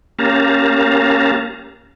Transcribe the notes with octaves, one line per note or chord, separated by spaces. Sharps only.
A#3 C#4 G4 F5 A5 A#5